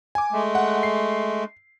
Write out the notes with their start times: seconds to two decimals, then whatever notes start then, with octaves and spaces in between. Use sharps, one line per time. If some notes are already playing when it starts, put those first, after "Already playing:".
0.15 G#5 D6
0.32 G#3 A3
0.55 F#5
0.83 C7